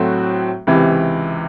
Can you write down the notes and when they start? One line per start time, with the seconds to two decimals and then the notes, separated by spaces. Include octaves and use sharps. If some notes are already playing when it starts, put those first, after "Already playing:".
Already playing: A2 F#3 A3 C4 F#4
0.67 C#2 C3 E3